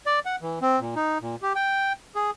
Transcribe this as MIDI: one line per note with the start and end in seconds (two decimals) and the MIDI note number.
0.06 0.19 74
0.26 0.36 78
0.41 0.59 52
0.62 0.80 60
0.80 0.95 46
0.96 1.18 63
1.21 1.36 46
1.42 1.53 67
1.55 1.93 79
2.15 2.31 68